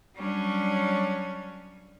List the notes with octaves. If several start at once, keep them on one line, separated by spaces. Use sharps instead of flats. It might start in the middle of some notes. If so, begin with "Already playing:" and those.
F#3 G3 C#4 D4 C#5